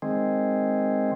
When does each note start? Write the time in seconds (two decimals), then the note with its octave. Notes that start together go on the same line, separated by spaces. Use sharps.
0.02 D#3 G#3 C4